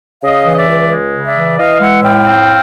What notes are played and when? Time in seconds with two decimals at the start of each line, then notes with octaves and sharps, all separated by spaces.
0.22 C#3 D#5 F5
0.45 E3
0.52 D#5
0.56 D5 E5
0.68 C#2
0.90 G#3
1.13 C#3
1.24 D5 E5
1.35 E3
1.58 E3 D#5 F5
1.80 G#3 E5 F#5
2.03 A2 F5 G5
2.26 C4